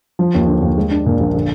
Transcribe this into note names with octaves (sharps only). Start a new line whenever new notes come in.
F3
D#2
D3
D#2
G#3
D4
A#2
A#1
D3